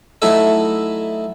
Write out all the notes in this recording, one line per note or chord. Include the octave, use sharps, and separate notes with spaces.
F#3 A3 D#4 E4 A4 E5